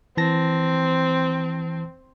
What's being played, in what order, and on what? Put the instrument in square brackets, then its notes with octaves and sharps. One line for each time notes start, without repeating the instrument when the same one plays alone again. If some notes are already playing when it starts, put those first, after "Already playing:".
[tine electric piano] E3 A5 A#6 [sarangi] C4